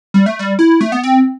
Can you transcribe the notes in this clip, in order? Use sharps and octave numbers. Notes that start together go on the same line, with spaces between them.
G3
A3
G3
E4
A3
B3
C4